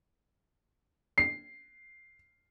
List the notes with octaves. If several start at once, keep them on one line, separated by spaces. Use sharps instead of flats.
C7